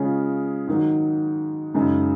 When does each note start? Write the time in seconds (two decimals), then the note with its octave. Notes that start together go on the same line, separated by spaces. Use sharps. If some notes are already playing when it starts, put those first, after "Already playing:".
Already playing: C#3 G#3 C#4 F4
0.67 G#2 D#3 F#3
1.74 F#2 C#3 G#3 D#4